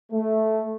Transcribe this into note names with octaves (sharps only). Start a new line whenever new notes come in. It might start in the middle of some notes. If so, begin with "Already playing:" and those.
A3